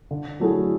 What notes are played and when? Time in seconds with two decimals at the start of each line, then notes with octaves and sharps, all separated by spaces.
0.11 D3
0.40 F#3 A3 E4 G#4